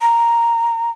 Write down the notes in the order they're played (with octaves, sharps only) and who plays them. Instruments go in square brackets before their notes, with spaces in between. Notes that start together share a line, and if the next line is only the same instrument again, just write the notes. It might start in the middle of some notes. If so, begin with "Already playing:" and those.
[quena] A#5